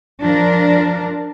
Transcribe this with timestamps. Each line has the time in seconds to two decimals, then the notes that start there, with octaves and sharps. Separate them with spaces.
0.21 F3 D4 A#4